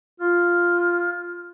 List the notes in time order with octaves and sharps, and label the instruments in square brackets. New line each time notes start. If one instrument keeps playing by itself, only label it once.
[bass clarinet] F4 [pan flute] F6